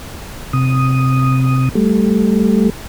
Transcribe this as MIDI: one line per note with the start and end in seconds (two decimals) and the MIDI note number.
0.53 1.69 48
0.53 1.69 87
1.75 2.70 55
1.75 2.70 57